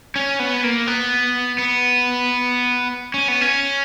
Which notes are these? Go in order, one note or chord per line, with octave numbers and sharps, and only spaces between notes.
C#4
B3
A#3
B3
B3
C#4
B3
C#4